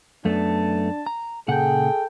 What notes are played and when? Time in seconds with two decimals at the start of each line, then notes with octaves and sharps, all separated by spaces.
0.25 F#2 A3 B3 D4 A5
1.06 A#5
1.48 A#2 C#3 G#4 A4 F#5 G5